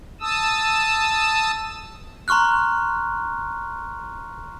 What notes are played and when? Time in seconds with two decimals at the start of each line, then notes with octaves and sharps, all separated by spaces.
0.21 A5 D#6 E6
2.28 A#5 C6 C#6 F6 F#6